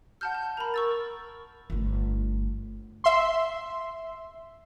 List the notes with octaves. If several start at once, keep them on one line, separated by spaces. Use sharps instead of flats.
F#5 A5 F6 G6
A5
A#4 A#5 B5
C#6 E6 A6
G1 A3
E5 C6